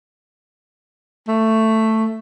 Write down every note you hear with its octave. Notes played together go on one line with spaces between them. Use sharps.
A3